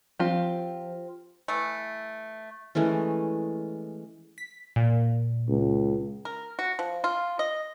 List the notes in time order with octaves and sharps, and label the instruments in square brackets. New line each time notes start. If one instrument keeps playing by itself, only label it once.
[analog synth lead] F3 [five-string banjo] C4 F4 G4
[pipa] E3 A3
[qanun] E3 G#3 A3 C#4
[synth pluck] B6
A#2
[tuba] C#2
[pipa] A#4
F#4
F3
F4
D#5